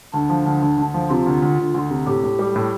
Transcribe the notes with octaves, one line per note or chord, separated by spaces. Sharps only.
D2 D4
F3
D2
D2
D2
F3
C3 F4
D2
D2
D2
D2
C3
A2 G4
A2
G3
A2